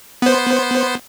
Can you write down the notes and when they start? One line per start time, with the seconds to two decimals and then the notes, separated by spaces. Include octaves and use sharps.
0.22 B3 C5